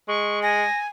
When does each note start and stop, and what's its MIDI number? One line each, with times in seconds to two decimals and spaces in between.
0.08 0.65 56
0.08 0.42 85
0.42 0.87 80
0.42 0.78 94